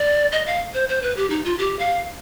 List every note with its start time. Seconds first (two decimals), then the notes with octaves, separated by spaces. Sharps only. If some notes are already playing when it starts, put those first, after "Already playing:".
Already playing: D5
0.32 D#5
0.46 F5
0.74 C5
0.89 C5
1.02 B4
1.17 G4
1.30 D#4
1.44 F4
1.58 G4
1.79 F5